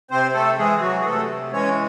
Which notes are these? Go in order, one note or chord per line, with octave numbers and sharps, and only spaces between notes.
C3 C4 C5
A3 A4
E3 G#3 G#4
F#3 F#4
G#4
C3 A3 A4
E3 G#3 C#4 C#5